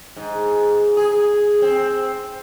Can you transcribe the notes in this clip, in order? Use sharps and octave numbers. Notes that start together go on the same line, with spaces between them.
G#2
G#4
C4